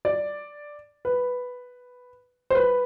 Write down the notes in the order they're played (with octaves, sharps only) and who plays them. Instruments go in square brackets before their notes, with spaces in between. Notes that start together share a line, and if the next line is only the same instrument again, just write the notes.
[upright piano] D5
B4
C5
B4